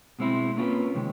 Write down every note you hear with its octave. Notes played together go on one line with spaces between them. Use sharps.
B2 G#3 C4 E4
A#3 C#4 F4 G#4 B4
C3 D#3 G#3 C#4